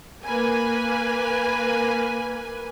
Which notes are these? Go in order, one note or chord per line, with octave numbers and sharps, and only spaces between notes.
A#3 B4 G#5